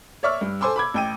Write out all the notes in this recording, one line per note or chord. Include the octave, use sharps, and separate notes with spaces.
C#5 D5 E5 C#6 E6 F6
G2
A4 C5 G#5 C6 D6 E6
B5 D6 G#6
A1 G5 D#7